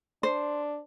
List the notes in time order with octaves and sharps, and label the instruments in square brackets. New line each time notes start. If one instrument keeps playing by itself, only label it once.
[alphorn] D4 [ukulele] C5